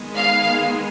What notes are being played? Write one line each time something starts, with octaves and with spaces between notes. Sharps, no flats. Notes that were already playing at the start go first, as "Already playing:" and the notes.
Already playing: D#3 G#3 B3
F5